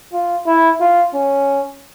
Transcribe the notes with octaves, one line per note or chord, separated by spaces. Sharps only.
F4
E4
F4
C#4